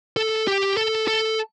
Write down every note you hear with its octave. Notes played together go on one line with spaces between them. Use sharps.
A4
G4
A4
A4